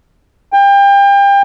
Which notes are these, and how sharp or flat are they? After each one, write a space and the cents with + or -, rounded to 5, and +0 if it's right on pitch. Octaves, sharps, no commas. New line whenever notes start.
G5 +30